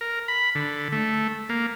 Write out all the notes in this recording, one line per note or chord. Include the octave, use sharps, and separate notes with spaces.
A#4
B5
D3
A3
A#3